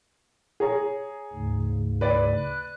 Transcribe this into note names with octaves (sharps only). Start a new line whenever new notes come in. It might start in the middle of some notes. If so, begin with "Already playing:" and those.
G#4 C#5 A#5
D2 G#2 C#3
B4 D5
F#6